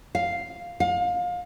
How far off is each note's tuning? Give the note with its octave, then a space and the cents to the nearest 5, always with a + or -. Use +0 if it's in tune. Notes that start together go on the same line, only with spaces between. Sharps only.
F5 +0
F5 +30